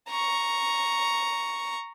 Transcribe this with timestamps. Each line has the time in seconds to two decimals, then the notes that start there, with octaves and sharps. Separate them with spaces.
0.10 A#5 C#6